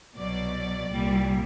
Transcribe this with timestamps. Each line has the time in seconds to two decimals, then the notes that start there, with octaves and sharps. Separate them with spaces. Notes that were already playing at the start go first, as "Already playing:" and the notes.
0.16 C2 B2 F#3 D5
0.89 C2 A#2 G3